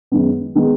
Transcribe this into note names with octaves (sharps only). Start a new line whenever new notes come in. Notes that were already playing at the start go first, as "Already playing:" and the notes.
F#2 D#3 G#3 B3
D#3 G#3 B3